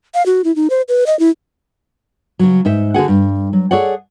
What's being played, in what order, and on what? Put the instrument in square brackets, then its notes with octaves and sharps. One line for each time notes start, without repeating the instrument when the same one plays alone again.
[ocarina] F5
F#4
E4
D#4
C5
B4
D#5
E4
[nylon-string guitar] C#3 F#3
G#2 D#4 E5
D3 F#4 G#4 F#5
G2
F#3
G#4 A4 C#5 D5 F#5